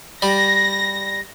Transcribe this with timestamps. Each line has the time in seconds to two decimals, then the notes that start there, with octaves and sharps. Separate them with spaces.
0.22 G3 A#6